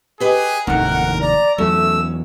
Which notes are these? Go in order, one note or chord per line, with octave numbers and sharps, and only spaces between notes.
G4 G#4 B4 D#5
F1 D#2 A2 D3 D#3 A#4 F#5
D5 A#5
E2 F#3 A3 C#4 E6